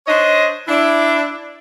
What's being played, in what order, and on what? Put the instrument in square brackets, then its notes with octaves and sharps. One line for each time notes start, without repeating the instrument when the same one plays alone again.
[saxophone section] D4 C5 C#5 D#5
D4 E4